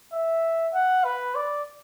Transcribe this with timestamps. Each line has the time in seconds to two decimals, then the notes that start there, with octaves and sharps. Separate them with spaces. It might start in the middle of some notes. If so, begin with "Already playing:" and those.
0.13 E5
0.74 F#5
1.04 B4
1.35 D5